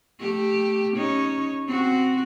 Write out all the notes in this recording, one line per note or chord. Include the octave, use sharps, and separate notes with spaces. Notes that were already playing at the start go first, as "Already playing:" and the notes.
A3 G4
C#4 D#4 C#5
C4 F#4